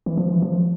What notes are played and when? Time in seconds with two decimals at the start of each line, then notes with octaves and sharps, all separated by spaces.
0.06 E3
0.17 F3
0.32 E3
0.42 F3